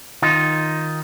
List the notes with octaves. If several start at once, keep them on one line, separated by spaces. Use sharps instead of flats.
D#3 D#4 F4